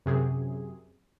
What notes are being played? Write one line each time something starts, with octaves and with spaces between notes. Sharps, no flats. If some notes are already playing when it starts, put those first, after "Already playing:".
F#2 C3 G#4